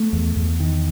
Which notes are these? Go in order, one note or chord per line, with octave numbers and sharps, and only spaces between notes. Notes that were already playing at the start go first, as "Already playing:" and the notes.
Already playing: A3
E2
E2
D#3